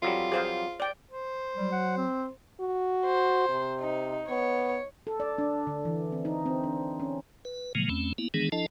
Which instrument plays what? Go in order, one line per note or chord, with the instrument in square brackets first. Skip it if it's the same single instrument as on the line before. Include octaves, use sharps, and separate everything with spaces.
[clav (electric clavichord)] F2 F#3 G3 [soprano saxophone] F4
[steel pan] G#4 C5 F5
D5 G5
[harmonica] C5
[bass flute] F#3 [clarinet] G3
[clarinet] F#5
C4
[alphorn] F#4
[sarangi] C5
[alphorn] C3
[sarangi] D#4
[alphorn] B3 [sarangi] C#5
[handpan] A4
D5
D4
D3
E3
C4
D#4
C4
D4
C#4
[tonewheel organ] B4
A#2 C#3 F3 F#3 G#3 A#3
E2 A3 C4 C#4
A#3 B3 E4
D#3 E3 G#3 B3 D4 G#4
F3 D4 E4 A4 D#5 A5